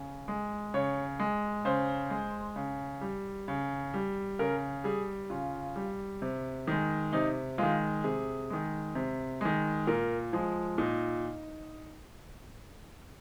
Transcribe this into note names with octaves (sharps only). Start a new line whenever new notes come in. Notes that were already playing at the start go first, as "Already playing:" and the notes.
Already playing: C#3
G#3
C#3 C#5
G#3
C#3 C5
G#3
C#3
G3
C#3
G3
C#3 A#4
G3 G#4
C#3 F4
G3
C3
D#3 G#3
C3 D#4
D#3 G#3 F4
C3 G#4
D#3 G#3
C3
D#3 G#3
A#2 A#4
F3 G#3
A#2 D#4